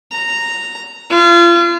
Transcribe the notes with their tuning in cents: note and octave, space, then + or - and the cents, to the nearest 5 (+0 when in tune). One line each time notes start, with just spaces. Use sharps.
A#5 -10
F4 -35